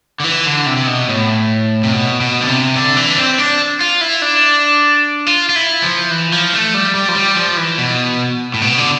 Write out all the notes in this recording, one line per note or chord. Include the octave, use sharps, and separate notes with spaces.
D3
E3
D3
C3
C3
B2
A2
C3
B2
B2
D3
C3
D3
E3
D4
C4
D4
F4
E4
D4
F4
F4
E4
F3
E3
F3
A3
G3
G3
F3
G3
F3
E3
B2
A2
B2
D3